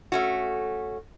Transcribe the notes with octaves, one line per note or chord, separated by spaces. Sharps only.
A3 C#4 F#4